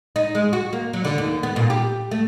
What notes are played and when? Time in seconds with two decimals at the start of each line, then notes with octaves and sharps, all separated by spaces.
0.16 D#4
0.35 G#3
0.53 F#4
0.73 A#3
0.93 F#3
1.05 D3
1.18 D#2
1.43 B3
1.56 A#2
1.70 G4
2.11 A3